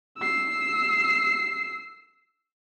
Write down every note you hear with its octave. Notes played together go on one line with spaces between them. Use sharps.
E6 C7